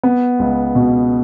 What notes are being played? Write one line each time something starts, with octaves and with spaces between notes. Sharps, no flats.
B3
C#2
B2